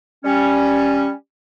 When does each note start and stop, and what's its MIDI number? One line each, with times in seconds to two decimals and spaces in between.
0.24 1.09 55
0.24 1.09 61